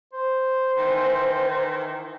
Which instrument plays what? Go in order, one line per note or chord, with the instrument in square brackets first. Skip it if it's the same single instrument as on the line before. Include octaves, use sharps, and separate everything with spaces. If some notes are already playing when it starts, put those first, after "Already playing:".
[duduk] C5
[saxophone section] D#3 E3